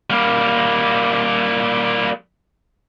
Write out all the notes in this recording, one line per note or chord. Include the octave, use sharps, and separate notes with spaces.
G3 A#3